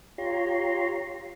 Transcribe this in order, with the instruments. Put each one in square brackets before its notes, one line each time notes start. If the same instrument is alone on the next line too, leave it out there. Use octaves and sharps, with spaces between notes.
[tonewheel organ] F4 G4 C#5 A#5 C6